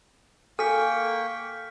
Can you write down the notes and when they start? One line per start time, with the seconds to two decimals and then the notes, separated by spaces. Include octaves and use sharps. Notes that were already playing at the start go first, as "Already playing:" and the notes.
0.59 A#3 A4 G5 G#5 C#6 F6 B6